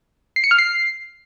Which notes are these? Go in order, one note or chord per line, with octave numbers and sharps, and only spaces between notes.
C7
C#7
F6
C7